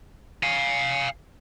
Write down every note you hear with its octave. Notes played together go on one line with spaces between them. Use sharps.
F5 G#5